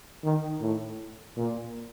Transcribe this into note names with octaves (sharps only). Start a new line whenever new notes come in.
D#3
A2
A#2